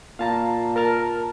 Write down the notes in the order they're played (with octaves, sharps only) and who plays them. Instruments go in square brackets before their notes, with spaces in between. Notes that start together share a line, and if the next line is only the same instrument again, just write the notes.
[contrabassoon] A#2 [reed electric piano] F5 A5 A#5
[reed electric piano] A#4 A5 F6